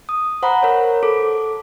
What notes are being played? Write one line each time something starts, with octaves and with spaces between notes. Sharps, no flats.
D#6
C5 F#5 A#5 B5
A#4 C#5
A4 D6